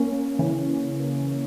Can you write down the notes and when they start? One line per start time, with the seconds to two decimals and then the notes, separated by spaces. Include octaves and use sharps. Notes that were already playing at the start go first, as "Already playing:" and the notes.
Already playing: A#3 C#4
0.39 C#3 E3